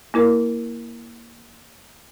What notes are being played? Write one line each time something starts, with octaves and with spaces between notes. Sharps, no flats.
A#3 E4 A#4